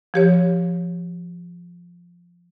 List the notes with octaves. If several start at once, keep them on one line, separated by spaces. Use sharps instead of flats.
F3 G4 C#5